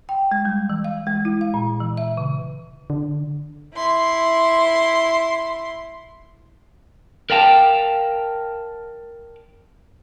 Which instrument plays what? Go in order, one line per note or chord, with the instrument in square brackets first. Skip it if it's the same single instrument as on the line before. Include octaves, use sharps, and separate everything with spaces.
[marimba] G5
G#3
G3
E3
F5
G#3
E4
F5
A#2
E3
E5
C#3
[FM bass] D3
[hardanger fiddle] E4 C6
[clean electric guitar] A#4 D5 F5 G5 A5